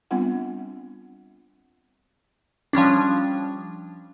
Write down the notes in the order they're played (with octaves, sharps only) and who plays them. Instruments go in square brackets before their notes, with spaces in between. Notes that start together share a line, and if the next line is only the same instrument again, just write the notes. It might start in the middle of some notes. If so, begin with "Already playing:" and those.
[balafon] G3 B3 C4 D4 F4 F#5
[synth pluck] F3 G3 C#4 D4